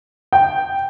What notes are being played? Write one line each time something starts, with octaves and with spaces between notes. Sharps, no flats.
G5